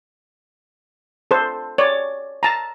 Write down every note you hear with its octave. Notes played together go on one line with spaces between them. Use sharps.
A4 C5
C#5 D5
A5 A#5